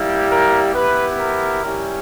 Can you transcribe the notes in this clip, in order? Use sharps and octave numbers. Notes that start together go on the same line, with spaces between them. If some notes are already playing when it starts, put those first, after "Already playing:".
Already playing: G3 A#3 E4 G4
A#4
B3 E4 G4 B4
A#4
G3 C#4 E4 G4